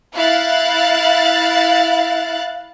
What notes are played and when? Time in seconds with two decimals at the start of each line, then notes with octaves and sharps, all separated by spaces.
0.15 E4 F5 F#6 A6